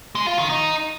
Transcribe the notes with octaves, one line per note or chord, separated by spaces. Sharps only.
G#3
F4
D#3
D#4